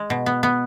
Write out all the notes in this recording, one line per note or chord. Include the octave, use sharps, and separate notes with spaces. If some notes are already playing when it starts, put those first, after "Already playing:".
Already playing: G#3
B2
B3
B3